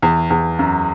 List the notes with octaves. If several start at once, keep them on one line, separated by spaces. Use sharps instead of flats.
E2
E2
F#2